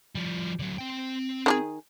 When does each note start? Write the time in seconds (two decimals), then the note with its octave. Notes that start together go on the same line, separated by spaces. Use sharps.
0.15 F3 G3
0.59 D3 F#3
0.78 C4 G5
1.46 D#3 D4 G#4